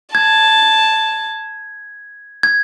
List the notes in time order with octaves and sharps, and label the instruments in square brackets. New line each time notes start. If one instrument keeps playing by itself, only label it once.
[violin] A5 [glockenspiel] G#6
[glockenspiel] G#6